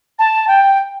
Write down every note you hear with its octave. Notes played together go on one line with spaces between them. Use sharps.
A5
G5